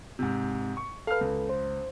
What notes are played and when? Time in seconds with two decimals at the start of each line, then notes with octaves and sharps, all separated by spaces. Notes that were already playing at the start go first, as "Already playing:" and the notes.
0.19 G#2 C3
0.77 C#6
1.07 A4 B4 F5 F6
1.21 C#2
1.49 C5